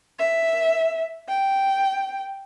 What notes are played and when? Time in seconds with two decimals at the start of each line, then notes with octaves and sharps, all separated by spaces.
0.19 E5
1.29 G5